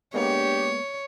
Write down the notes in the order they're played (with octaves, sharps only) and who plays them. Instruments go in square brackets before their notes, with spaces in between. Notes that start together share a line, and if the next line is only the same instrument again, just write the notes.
[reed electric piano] G#3 A#3 B3 [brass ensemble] D4 G4 [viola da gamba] C#5